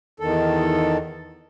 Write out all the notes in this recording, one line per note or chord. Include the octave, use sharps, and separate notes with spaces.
E2 D#3 A4